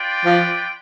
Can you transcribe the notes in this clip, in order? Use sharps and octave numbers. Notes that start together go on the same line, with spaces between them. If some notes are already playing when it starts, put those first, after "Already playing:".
Already playing: F4 B4 D5 G5
F3